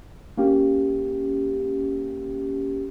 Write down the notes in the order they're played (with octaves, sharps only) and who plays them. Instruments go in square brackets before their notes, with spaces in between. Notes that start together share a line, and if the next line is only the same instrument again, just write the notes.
[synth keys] A#3 C#4 G4